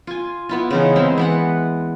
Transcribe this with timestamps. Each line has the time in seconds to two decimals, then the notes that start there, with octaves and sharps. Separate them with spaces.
0.07 F4 G#5
0.49 B3 E4 F4
0.71 C#3 E3 D#4
0.96 G#3 C4 E4
1.18 E3 B3 F#5